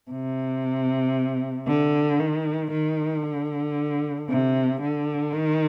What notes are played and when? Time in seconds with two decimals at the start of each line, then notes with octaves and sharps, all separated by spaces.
0.11 C3
1.67 D3
2.20 D#3
2.71 D#3
3.24 D3
4.29 C3
4.81 D3
5.32 D#3